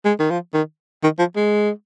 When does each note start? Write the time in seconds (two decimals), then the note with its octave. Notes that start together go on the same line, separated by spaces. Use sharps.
0.05 G#3
0.20 D#3
0.31 F3
0.54 D#3
1.04 D#3
1.19 F3
1.36 G#3